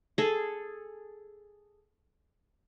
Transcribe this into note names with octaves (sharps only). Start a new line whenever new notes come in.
G#4 A4